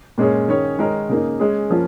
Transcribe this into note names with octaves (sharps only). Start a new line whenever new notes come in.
A#2 G#3 C#4 G#4 C#5
D#3 C#4 G#4 C#5
D#3 G#3 D#4 A#4 C#5
C#3 A#3 D#4
G#3 C#4 G#4
F3 A#3 C#4 F4